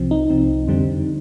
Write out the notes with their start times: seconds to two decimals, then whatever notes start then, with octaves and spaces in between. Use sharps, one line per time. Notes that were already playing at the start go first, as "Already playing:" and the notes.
Already playing: C2 C3 F3 C4
0.11 D#4
0.30 C2 C3 F3 C4
0.68 F2 D3 G3 C4